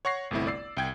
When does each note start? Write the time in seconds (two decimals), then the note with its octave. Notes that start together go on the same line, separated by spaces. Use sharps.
0.05 C#5 F#5 C#6 A#6 C7
0.31 G1 C2 A3 C4 E4
0.47 D5 E6 C7
0.77 C2 G5 G#6